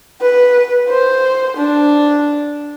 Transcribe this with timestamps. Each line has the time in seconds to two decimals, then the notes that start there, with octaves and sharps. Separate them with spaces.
0.21 B4
0.89 C5
1.57 D4